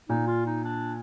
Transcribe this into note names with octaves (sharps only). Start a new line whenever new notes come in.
A#2 D#4
F4
D#4
D4